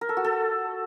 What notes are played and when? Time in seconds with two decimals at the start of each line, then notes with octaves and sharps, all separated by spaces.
0.01 A#4
0.09 A4
0.17 F#4
0.24 A4